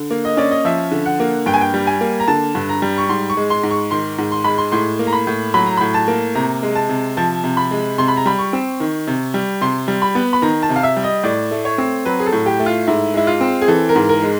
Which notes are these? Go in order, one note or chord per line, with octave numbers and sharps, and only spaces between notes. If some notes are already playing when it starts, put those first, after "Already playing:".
Already playing: D3
A#3
D#5
C#4 D5
D#5
F3 E5
D3
F#5
A#3
G2 G5
G#5
G5
G3
G#5
A#3
A#5
D3 A5
G2
A#5
G3
C#6
G#2 C6
C#6
G#3
C6
G#2
C#6
D#3 C6
G#2
C6
G#3 B5
C6
A2 C6
A#3
A#5
B5
A2
F#3 B5
A#5
A2 B5
A5
A#3
C3 A#5
G#3
A5
C3
F3 A5
C3
B5
G#3
C3 C6
B5
A#5
G3 B5
C#6
C4
D#3
C3
G3
C3 C6
G3
B5
B3
B5
D#3 A#5
A5
C3
F5
E5
G3
D#5
A2 D5
A3
C#5
C4
F#3 B4
G#4
A4
A2
G4
A3
F4
G#2 E4
G#3 E4
F4
C4
G#4
E3 A4
A#4
G#2
A#4
G#3